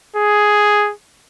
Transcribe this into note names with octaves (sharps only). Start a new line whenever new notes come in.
G#4